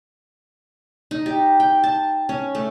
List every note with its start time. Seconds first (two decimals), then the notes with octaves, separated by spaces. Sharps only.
1.11 D#4
1.26 G4
1.60 G5
1.84 A5
2.29 C#4
2.55 A3